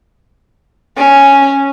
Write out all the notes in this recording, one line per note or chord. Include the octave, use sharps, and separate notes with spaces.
C#4